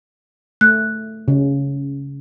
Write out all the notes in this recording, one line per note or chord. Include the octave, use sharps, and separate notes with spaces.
A3 F#6
C#3